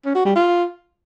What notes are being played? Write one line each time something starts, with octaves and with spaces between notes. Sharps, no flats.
C#4
F#4
G3
F4